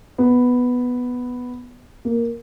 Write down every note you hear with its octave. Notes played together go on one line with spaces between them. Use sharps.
B3
A#3